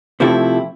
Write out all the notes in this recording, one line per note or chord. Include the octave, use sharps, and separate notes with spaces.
C3 F3 A3 C4 E4